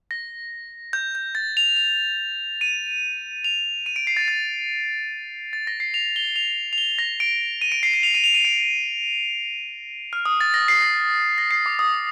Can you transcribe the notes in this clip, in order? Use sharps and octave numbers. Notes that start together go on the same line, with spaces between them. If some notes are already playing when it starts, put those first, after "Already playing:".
A#6
G6
G6
A6
F7
F7
D#7
F7
D#7
D7
C7
A6
A6
A6
A#6
C7
F7
G7
F7
F7
G7
A#6
D7
D#7
D7
C7
C7
F7
D#7
F7
D#7
D7
F6
D#6
A6
A#6
C7
A#6
A#6
C7
D6
D#6